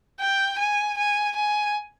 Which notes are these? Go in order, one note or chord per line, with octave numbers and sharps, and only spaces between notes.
G5
G#5
G#5
G#5